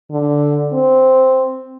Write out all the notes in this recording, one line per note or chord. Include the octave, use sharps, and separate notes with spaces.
D3
C4